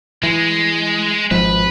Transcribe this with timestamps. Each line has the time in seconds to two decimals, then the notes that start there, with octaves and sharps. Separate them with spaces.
0.23 E3 G#3
1.31 G#1 F3 G#3 B4